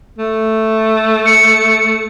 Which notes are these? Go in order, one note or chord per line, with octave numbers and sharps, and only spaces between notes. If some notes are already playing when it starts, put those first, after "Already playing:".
A3
C#7